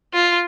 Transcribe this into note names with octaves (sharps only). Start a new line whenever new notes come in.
F4